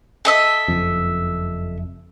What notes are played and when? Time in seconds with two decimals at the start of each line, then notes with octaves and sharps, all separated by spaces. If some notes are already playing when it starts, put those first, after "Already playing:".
0.25 A4 D#5 E5
0.68 F#1 F2